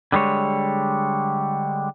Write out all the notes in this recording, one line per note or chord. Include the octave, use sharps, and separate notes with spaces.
D3 G3 G#3 C#5